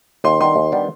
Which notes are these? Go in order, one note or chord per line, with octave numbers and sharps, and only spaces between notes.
D#2 C6
D#3 G3 B3 D4 C6
D#2
D#3 G3 B3 D4